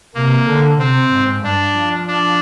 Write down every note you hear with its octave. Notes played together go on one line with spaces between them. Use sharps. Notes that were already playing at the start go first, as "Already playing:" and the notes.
C3 A#3
D3
C3 C4
G#2
G2 D4
F3
D4